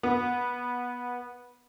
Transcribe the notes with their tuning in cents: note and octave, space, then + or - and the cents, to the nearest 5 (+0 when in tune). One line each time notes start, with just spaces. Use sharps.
B3 -15